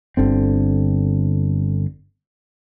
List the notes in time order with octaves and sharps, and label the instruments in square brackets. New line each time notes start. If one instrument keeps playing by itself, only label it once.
[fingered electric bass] G1 D3 C4